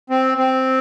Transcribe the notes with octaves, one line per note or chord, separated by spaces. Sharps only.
C4
C4